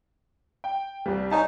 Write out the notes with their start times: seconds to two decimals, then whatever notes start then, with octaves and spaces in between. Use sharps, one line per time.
0.64 G5
1.06 C2 G3
1.31 D#4 C#5 G#5 A5